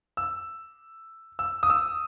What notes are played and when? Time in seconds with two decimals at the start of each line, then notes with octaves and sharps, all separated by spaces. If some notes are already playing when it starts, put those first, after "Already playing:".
0.17 E6
1.39 E6
1.63 D#6
1.70 E6